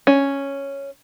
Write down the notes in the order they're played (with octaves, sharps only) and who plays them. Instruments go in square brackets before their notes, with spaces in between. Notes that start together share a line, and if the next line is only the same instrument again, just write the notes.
[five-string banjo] C#4